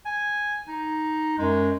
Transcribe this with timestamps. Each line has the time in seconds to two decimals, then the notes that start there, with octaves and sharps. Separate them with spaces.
0.05 G#5
0.68 D#4
1.38 F#2 G#3